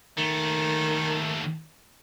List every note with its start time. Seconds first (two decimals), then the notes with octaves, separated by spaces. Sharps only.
0.18 D#2 D#3 A3